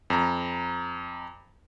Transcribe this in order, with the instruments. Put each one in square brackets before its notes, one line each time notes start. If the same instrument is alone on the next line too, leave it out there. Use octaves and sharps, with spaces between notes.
[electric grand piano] F2 A#5